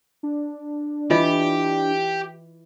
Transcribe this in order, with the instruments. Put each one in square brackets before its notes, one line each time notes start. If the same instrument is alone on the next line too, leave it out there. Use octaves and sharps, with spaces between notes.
[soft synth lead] D4
[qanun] E3 [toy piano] F4 D#5 [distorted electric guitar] G4